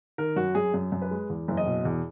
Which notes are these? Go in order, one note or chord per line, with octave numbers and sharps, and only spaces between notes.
D#3 A#4
F#2 F#4
F#2 G#4
F#2
F#2
B4
G#3
E2
F#1
D#5
B2
E2